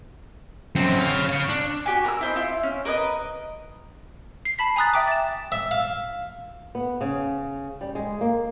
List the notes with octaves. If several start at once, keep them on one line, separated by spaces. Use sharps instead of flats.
F#2 C4
C#5 F5
C#5 F5
D4
F#4 G4 G#5
A#4 B5 E6
E4 C5 D#5
E4 F4
C#4
A#4 B4 C#5 D#5
C7
A5 B5 B6
G#5 A#5 D#6 F#6 A6
E5 G5 D6
A6 E7
E5
F5
B3
C#3
G3
G#3
A#3